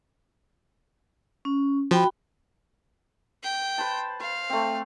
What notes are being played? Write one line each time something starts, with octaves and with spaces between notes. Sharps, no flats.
C#4
F3 F#4 G5 B5
G5
B4 C5 A5
C5 F5
A3 C4